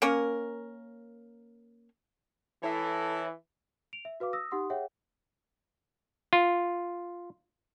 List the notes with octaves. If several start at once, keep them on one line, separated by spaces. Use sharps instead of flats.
A#3 C#4 A#4
E3 E4 A4 C#5 E5
D7 F7
E5
F#4 B4 F5 D6
D#6 E6 A#6
D#4 G4 F#5 C6 D#6
G#4 C#5 E5 F#5 G5
F4